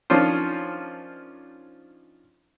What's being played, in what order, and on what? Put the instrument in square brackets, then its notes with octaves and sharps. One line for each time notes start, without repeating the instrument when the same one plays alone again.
[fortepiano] D#3 F3 C#4 D4 F4 C5